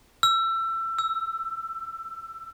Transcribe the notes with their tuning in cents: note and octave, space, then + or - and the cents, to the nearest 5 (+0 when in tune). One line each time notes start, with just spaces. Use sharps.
E6 +25
E6 +5